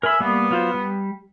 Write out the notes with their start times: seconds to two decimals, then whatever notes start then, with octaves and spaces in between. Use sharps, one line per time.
0.03 A#4 E5 G#5 B5
0.20 G3 A#3 B3
0.51 F#3 F4 C5
0.74 G3